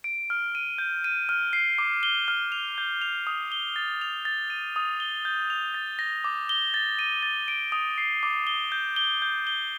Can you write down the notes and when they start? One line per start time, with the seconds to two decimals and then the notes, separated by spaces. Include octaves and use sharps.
0.04 D7
0.30 F6
0.55 D#7
0.78 G6
1.04 D#7
1.29 F6
1.53 C7
1.78 D6
2.03 G7
2.28 F6
2.52 F7
2.78 G6
3.02 F7
3.27 D#6
3.52 G7
3.76 A6
4.01 F7
4.25 A6
4.50 D#7
4.76 D#6
5.00 G7
5.25 G6
5.50 F7
5.74 A6
5.99 A#6
6.24 D6
6.49 G7
6.74 A6
6.99 D#7
7.23 A6
7.48 D7
7.72 D#6
7.98 C7
8.23 D6
8.47 G7
8.72 G6
8.96 G7
9.22 G6
9.47 G7